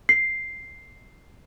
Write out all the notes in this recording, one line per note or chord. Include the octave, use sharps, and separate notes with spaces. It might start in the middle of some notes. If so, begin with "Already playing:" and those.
C7